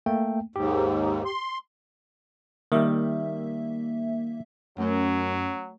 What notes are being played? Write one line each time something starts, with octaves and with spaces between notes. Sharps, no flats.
A3 A#3 G5
D#2 G#2 G4
C6
D#3 G3 A#3 E5
F#2 F#3 A3 C#4 A#4